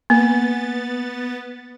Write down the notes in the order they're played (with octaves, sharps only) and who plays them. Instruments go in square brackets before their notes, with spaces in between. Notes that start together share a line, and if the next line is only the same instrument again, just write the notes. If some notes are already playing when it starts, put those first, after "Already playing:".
[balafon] A#3 [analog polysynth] B3 A6